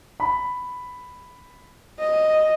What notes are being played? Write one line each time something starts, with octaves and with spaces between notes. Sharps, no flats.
B5
D#5